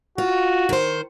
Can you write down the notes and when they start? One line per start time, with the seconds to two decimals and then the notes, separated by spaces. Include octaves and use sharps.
0.18 F4 F#4
0.69 D#3 C5